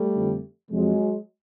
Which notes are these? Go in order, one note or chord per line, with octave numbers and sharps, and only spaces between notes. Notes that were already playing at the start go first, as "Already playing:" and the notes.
Already playing: G3 A3
F2 D3 F3
F2 C3 F3 F#3 G#3